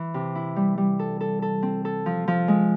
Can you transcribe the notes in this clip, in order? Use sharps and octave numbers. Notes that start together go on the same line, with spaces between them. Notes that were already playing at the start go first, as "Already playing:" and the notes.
Already playing: E3
C3
E4
G3
G3
A4
A4
A4
C4
A4
F3
F3
G#3